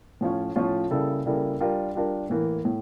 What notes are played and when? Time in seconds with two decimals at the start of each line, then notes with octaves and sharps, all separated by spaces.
0.21 A2 F3 C#4 F4 C#5
0.56 A2 F3 C#4 F4 C#5
0.91 C#3 G3 A#3 E4 A4
1.26 C#3 G3 A#3 E4 A4
1.60 G3 D4 F4 A#4
1.95 G3 D4 F4 A#4
2.30 A2 E3 A#3
2.65 A2